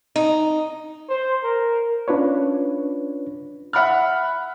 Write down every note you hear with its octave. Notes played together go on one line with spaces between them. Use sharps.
D#4
C5
A#4
C#4 D4 F4 B4 C#5
E5 F#5 B5 F6